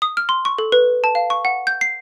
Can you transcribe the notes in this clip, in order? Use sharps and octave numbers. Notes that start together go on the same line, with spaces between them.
D#6
F6
C6
C#6
A4
B4
A5
F5
C#6
F#5
G6
C7